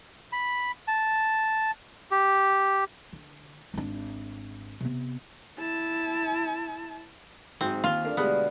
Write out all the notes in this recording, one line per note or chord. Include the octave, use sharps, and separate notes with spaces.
B5
A5
G4
D3
G#1 D4
C3 B3
E4 A5
G#1 G#2 F#3 C4
D#2 F4 F6
A3 D4 A#4 F5
D2 B2 D3 G3 G#3 B3 F#4